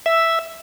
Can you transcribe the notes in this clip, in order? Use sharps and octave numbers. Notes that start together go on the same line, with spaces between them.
E5